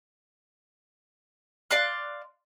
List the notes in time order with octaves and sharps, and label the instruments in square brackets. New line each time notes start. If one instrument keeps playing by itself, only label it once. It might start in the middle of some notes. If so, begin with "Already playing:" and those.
[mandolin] D5 F5 C6 F#6